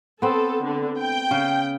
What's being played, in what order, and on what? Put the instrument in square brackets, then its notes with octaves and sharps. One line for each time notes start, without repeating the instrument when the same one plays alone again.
[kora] B3 C4 [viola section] A4
[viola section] D3
G5
[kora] C#3